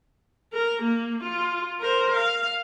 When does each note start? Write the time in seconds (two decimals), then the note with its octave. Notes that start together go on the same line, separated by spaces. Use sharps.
0.53 A#4
0.82 A#3
1.23 F4
1.80 A#4 C5
2.14 F5